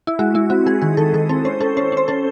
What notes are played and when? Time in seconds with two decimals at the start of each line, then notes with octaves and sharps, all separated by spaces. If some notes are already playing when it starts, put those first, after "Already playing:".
0.07 E4
0.19 G#3 F#4
0.34 G#3 E4
0.50 C4 F#4
0.66 G#3 G#4
0.82 D#3 G#4
0.97 D#3 A4
1.13 D#3 A4
1.29 C4 A4
1.45 C#4 C5
1.61 C#4 A4
1.77 C#4 C5
1.92 C#4 C5
2.08 C#4 A4